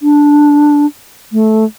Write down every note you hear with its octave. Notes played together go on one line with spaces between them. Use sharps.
D4
A3